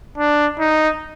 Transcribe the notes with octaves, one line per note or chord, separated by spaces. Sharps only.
D4
D#4